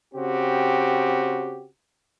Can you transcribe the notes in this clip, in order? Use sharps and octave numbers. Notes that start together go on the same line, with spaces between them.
C#3 C4 F#4 G4